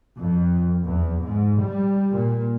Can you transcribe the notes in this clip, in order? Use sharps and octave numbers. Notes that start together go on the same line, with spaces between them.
F2
E2
G#2
G3
A#2